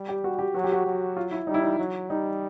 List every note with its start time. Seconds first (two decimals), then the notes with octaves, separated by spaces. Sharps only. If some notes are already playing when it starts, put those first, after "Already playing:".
Already playing: G3
0.09 G4
0.24 F#4
0.39 G4
0.54 F#3 F#4
0.64 G4
0.72 F#4
0.86 F#3
1.17 F4
1.32 E4
1.47 G3 D#4
1.54 E4
1.62 D#4
1.79 F#3
2.10 G3 D#4